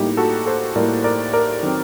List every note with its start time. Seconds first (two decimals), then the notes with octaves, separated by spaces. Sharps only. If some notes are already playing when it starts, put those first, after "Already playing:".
Already playing: A2 G3 A#3 D#4 G4
0.17 F#4 A4
0.46 A4 C5
0.76 A2 G3 A#3 A#4 D5
1.04 A#4 D5
1.33 A#4 D5
1.63 D#3 F#3 C4